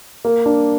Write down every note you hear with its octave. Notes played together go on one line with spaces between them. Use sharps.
A#3
D4